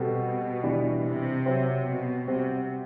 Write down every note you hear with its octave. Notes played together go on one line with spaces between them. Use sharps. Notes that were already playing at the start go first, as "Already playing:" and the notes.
Already playing: B2 G3 C4 F#4 A4
E3 G3 D4 G4 D5
C3
F#3 C4 G4 C5 E5
B2
C3 G3 C4 F#4 C5